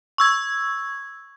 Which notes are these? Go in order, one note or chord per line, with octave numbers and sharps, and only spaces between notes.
C#6 E6 G#6